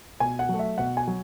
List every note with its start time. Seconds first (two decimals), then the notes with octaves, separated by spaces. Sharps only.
0.20 B2 G#5
0.39 F#5
0.49 F#3 A3
0.59 E5
0.78 B2 F#5
0.97 G#5
1.07 F#3